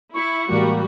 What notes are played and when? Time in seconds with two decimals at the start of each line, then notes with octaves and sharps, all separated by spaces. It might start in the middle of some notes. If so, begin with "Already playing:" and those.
0.14 E4 C#6
0.49 A2 E3 G3 G#3 A#3 F#4